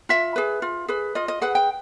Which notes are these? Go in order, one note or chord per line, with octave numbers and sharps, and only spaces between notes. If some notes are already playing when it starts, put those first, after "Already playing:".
F4 E5
G#4 B4
F4
G#4 B4
F4 D#5
D#5
G#4 B4 F#5
G5